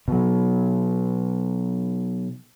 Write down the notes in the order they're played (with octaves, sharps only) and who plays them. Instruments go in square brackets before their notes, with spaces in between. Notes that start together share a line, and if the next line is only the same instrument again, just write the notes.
[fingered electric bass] B2 F#3